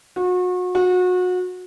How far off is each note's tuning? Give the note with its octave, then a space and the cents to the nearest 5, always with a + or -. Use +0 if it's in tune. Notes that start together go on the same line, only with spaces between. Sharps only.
F#4 -35
F#4 -30